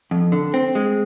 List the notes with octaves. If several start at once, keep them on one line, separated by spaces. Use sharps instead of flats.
F2
D3
C4
G#3